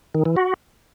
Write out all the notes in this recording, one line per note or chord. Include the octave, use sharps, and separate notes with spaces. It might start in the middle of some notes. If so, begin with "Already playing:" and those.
D#3
E3
F#4